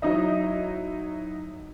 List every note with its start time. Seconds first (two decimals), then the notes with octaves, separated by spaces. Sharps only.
0.02 F#3 D#4 E4 D#5 E5